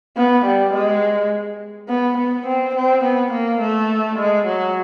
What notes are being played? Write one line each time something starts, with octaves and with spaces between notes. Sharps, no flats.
B3
G3
G#3
B3
B3
C4
C4
B3
A#3
A3
G#3
F#3